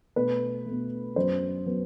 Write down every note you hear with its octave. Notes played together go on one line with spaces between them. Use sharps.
B2 A3 B4
A3
B2
F#2 F#3 B3 C5
F#3 B3